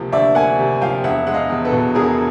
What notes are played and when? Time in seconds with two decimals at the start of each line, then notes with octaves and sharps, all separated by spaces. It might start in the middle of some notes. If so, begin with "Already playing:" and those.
Already playing: D2 C3 F3 A#3
0.12 D2 D5 E5
0.35 A#3 F#5 G#5
0.59 C3
0.81 F3 F5 G5
1.04 E1 E5 F#5
1.27 G#3 F#5
1.34 D#5 F5
1.50 E2
1.65 A4 B4
1.72 B2
1.95 E1 G#4 A#4